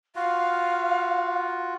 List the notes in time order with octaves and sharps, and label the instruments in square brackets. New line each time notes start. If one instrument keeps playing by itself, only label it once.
[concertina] F4 F#4 [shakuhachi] F5